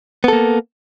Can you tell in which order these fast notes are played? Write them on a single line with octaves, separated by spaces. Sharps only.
B3 A4 A#3